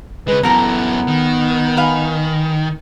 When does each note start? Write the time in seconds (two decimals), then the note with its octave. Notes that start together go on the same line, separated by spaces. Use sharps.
0.28 C#3 G#3 B4
0.43 F#2 E3 B3 A4 A#4 A#5
1.08 D#3
1.77 B4 F5 G#5